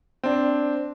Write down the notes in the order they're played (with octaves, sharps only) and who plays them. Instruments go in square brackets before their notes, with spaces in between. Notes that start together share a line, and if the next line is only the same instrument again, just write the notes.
[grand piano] C4 D4